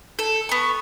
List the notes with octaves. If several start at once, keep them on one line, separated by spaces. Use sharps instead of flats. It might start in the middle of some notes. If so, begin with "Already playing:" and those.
A4
B3 C#6